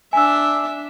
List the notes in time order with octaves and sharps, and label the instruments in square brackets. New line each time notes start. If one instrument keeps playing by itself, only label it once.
[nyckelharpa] D4 E5 [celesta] G#5 E6